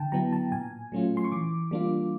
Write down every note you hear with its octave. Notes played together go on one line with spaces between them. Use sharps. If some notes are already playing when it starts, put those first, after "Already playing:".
Already playing: D3 G5 A5
F#3 B3 E4 A#5
A5
A#2 G#5
F#3 A3 C#4 F4
C6
C#6
E3 D6
G3 A#3 D4 F4